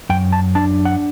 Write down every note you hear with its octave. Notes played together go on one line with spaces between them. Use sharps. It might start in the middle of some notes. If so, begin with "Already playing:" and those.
F#2 G5
A5
D4 A5
F#5